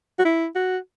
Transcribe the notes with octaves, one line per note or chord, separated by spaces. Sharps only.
F#4
E4
F#4